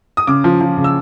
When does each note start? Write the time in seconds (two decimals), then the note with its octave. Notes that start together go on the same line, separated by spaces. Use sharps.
0.17 D#6
0.27 C#3 D6
0.44 F3
0.61 F3
0.77 C#3
0.84 E6